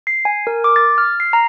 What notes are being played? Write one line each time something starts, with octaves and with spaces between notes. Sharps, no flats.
C7
G#5
A#4
D6
A6
F6
C7
A#5